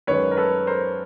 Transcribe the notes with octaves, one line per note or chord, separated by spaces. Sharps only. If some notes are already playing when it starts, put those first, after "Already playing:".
F#2 D#3 G#3 B4 C#5
A#4
A4 B4
A#4 C5